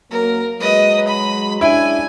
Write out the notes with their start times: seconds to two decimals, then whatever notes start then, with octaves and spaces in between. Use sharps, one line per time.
0.11 F#2 F#3 A#3 A#4
0.60 F#3 G#3 B4 D#5
1.07 B5
1.61 G#3 C#4 D4 E4 G#5